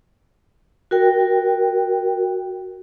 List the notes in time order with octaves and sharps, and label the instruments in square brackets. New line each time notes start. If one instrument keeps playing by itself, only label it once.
[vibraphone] F#4 A#4 G5